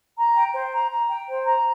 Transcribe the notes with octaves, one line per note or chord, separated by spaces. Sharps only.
A#5
G5
C5
A#5
A#5
G5
C5
A#5